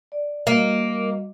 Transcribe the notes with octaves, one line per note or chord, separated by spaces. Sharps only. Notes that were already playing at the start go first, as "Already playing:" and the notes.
D5
G3 A#3 F#4 D#5